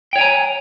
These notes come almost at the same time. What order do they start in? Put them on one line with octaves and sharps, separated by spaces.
G5 C#5 G#5 A#5